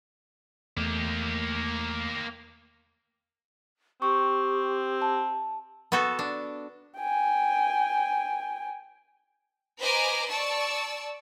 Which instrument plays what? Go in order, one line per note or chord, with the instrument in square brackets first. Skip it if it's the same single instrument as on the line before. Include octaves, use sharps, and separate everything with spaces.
[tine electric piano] E2 A3 [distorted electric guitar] A#3 G4
[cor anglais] C4 [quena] G4 [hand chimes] C#6
[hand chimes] A5
[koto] B3 F#4 A4
D4
[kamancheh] G5 G#5
[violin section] B4 C5 D#5 G#5 A#5 D6
D5 A5 C#6 E6